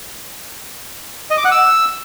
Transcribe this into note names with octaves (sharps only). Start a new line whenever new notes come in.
D#5
D6
F#5
E6